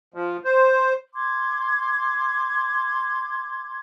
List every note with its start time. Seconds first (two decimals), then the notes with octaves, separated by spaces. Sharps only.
0.14 F3
0.45 C5
1.15 C6 D6 G#6